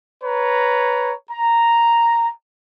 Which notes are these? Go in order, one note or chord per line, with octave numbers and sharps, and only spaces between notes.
B4 C#5 A#5
A#5